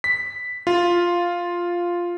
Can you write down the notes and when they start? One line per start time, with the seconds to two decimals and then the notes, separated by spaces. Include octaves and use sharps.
0.04 B6
0.67 F4